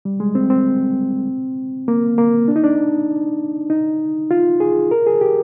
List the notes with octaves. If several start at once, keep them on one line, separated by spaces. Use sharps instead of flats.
G3
G#3
C4
C4
A#3
A#3
D4
D#4
D4
D#4
F4
G#4
A#4
G#4
G4